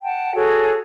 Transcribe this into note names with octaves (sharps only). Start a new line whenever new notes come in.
F#5 G5 A5
F#4 G#4 A4 C#5